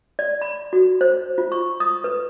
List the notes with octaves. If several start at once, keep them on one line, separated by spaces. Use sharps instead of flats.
D5
B5
F#4
C5
F4
C#6
D#6
B4